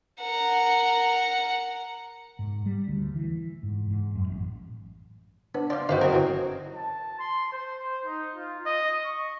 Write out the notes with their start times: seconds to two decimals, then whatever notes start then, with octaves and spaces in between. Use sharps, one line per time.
0.21 A#4 F#5
2.39 G#2
2.66 G3
2.88 D2
3.15 E3
3.63 G#2
3.90 G#2
4.15 F#2
4.28 A1
5.55 B3 D4
5.70 F3 D5 F5 C6
5.89 G1 D#3 D#4 F#4 B4 C5 F5 G5
6.01 F#2 C4 A#4 D#5
6.13 E3 F#3
6.75 A5
7.19 C6
7.53 C5
8.05 D#4
8.36 F4
8.66 D#5
9.05 C#6